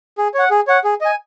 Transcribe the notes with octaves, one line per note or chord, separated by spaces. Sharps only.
G#4
C#5 F#5
G#4
C#5 F#5
G#4
D#5 G#5